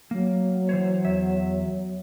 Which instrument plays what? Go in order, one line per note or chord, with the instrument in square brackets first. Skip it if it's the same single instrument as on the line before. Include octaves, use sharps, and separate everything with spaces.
[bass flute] F#3 [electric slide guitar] A#3
[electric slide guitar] E3 C5 C#5
E2 E5